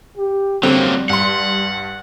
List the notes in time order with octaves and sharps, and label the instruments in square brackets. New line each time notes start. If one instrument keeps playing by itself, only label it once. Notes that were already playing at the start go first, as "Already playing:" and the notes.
[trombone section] G4
[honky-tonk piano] D3 C4 [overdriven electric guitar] F#3 A#3 [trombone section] G3
[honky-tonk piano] G2 C6 [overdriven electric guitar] F#5